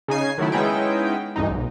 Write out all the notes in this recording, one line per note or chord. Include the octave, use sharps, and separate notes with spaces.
C#3 D#4 G#5 C7
D#3 F#3 A3 E4
G#3 B3 C#4 D#4 E4 G5
D2 G2 E3 D#4
B1